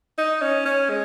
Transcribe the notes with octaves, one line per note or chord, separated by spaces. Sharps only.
D#4
C#4
C#4
G#3